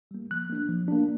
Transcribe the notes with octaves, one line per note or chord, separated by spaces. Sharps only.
G3 A#3
F3 F#6
A#3 D4
F3
A#3 D4